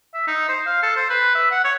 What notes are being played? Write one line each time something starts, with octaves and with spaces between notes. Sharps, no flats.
E5
D#4
C5
F5
A4
C5
B4
E5
F#5
C#5